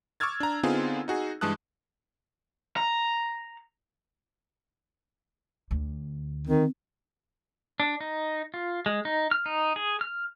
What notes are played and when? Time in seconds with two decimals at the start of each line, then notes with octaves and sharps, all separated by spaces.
0.20 C#6 D6 E6 F6 G#6 A6
0.40 D4 A#5
0.63 D3 B3 C4 D#4 F4 G#4
1.08 D#4 F#4 G#4
1.41 G2 E3 G#3 A5 D#6 F#6
2.77 A#5
5.71 D2
6.47 D#3 C4
7.80 D4
8.01 D#4
8.54 F4
8.86 G#3
9.05 D#4
9.31 F6
9.46 D#4
9.76 G#4
10.01 F6